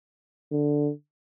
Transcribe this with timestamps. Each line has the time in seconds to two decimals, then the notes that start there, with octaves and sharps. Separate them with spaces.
0.52 D3